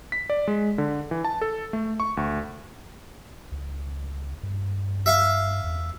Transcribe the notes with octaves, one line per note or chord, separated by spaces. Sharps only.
B6
D5
G#3
D3
E3
A5
A4
A3
C#6
D2
C#2
G2
E5 F5
E2